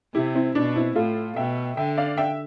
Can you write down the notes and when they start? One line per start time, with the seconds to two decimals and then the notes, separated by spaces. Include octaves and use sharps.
0.14 C3 E4 G4
0.35 C4 E4
0.55 B2 D4
0.75 C4 E4
0.95 A2 F4 A4
1.36 B2 E5 G5
1.77 D3 E5 G5
1.97 D5 F5
2.17 E5 G5